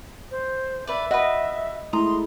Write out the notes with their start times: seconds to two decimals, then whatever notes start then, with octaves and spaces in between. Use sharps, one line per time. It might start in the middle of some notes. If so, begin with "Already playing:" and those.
0.31 C5
0.87 B4 D5 E5
1.11 F#4 B4 D#5
1.93 G#3 A3 E4 A#5 C6 D#6